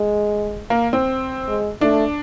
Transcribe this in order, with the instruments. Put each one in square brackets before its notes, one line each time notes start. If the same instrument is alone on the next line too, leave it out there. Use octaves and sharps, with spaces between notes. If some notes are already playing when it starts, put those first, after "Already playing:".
Already playing: [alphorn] G#3
[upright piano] A#3
C4
[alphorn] G#3
[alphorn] A3 [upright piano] D4